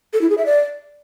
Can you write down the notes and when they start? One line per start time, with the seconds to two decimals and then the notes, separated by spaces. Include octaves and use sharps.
0.13 A4
0.21 E4
0.30 G#4
0.38 E5
0.46 D5